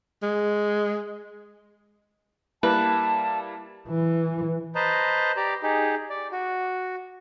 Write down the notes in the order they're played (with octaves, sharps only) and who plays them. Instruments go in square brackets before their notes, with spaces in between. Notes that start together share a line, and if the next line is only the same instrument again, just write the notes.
[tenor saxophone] G#3
[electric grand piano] G3 A#3 E4 [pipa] B4 [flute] A5
[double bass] E3
[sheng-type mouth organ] B4 C5 D#5 A5 A#5
G4 D5 A#5
D#4 G4 G#4
D5
F#4